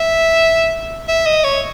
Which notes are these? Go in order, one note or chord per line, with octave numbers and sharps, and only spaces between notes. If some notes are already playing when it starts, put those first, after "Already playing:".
Already playing: E5
E5
D#5
C#5